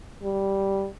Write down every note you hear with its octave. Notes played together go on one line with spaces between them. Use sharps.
G3